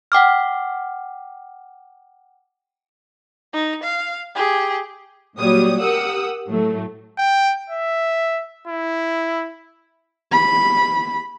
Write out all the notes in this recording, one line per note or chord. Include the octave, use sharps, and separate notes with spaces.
F#5 G5 D6 F6
D#4
F5
G4 G#4
A#2 F#3 G3 C#5 D#6
G4 A#4 F#5 D#6 E6
A2 F#3 A3
G5
E5
E4
B5